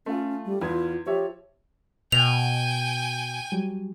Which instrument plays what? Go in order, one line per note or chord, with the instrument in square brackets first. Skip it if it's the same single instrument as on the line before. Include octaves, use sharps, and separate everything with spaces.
[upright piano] A3 F4 [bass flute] C#4
[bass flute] G3
[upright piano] E2 B4 G#6 [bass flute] F4
[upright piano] F3 C#5 E5 [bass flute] G4
[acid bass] B2 [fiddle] G5 G#5 [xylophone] F7
[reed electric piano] F#3 G3